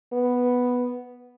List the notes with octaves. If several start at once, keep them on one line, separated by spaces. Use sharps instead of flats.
B3